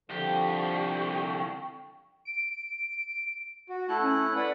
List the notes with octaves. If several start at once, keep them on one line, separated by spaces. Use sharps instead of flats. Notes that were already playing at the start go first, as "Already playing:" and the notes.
C2 D3 F3 G4 G5 C#6
D7
F#4
A3 E4 A5 F#6
C#4
B4 D5 F#5 B5